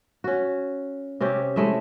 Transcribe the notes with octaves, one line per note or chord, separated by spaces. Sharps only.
C#4 F#4
C3 C4 C#4 G4
G#3 A3 E4 E5